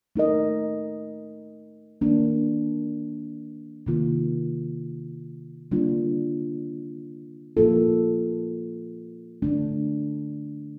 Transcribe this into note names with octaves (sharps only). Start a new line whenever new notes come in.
A3 D#4 A#4 D#5
D#3 A#3 D4
C3 D#3 A#3 F4
D3 G3 A#3 D4 F4
A#2 F3 A#3 F4 A4
D3 A3 D4